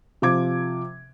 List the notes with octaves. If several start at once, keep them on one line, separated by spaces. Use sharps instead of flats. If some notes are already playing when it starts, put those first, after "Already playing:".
C3 F3 D6 G#6